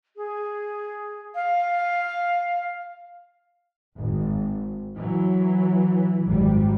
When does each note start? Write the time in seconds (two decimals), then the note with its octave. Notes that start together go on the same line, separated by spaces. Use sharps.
0.16 G#4
1.35 F5
3.96 G#1
4.98 E3 F#3
6.27 G#1 F#2 G3